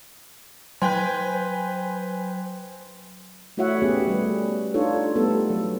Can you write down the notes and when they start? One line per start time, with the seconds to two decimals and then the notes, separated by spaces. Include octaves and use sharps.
0.82 F#3 B4 C5 G5 G#5 C6
3.57 A3 E4 F#4 C#5 E5 F#5
3.82 B3 C#4 G4 G#4
4.07 G3 A3 B4
4.74 D4 D#4 F4 A4 C#5
5.15 G3 A3 B3 D#4 G4 A4
5.50 F#3 G#3